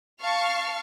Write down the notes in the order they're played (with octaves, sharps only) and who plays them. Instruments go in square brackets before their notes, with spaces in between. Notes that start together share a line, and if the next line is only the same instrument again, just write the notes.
[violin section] F5 A5 C#6 F6